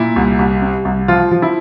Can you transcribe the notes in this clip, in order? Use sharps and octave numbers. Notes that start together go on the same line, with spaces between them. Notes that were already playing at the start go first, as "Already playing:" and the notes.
Already playing: A#2 E4
C2
C2
C3
C2
F3 F4
F3
E4